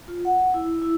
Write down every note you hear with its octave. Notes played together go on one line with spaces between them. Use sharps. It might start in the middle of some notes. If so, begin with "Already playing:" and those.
F4
F#5
E4
E4